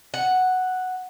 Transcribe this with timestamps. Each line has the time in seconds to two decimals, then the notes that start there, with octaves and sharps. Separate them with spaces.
0.14 F#5